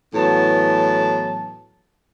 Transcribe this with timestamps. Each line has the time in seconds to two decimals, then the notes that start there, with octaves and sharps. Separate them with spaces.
0.15 A2 E3 F#3 B3 A5